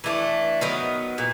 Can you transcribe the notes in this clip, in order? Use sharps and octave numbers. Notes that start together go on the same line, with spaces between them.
E3 A3 D4
D#3 F#3 B3
A#2